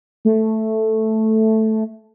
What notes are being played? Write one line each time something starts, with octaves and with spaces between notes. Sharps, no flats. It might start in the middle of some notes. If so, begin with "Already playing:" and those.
A3